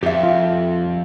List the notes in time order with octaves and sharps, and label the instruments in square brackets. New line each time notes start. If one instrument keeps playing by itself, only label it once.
[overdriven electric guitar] F2 [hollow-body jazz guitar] G4 E5
[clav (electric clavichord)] F4